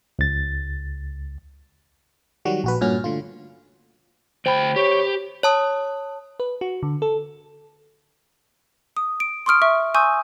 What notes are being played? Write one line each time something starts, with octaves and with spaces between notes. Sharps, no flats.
C#2 A6
D#3 F#3 G3 F#4
A#1 F#4 B4
G2 A#2 C#4 F#4 F6
D3 A3 F4
D2 C5 G5 B5
G4 C#5
C#5 A5 D#6
B4
F#4
D3
A4
D#6
D7
C6 C#6 D#6 F6 D7
E5 C#6
G#5 C6 C#6 D#6 E6 G6